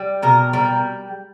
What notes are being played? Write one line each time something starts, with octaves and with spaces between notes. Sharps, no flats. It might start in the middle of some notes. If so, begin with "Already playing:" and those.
Already playing: G3
B2 A#4
G3 A#4